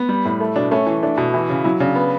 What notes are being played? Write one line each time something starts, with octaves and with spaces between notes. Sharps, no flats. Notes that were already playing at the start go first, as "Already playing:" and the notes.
Already playing: B3
G3
A2
A3
B2 D4
A3 C#4
E3
A3 D4
B2
E3 E4
C#3
F#3 E4
C#3 D4
B3